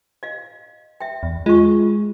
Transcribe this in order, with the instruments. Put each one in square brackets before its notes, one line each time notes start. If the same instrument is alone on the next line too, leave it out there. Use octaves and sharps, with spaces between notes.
[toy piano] D#5 F5
E5 G5
[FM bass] E2
[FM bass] G#3 [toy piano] F4 C#6